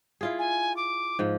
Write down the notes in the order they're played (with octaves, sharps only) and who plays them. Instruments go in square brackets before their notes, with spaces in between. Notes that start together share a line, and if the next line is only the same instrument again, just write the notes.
[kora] E4 F4 G#4
[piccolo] G#5
D6
[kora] G#2 F3